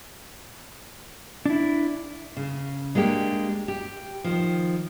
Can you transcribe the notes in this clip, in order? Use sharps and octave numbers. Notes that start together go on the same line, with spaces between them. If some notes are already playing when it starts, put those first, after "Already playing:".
D4 E4
C#3
G#3 A#3 D4 G4
G4
D#3 F3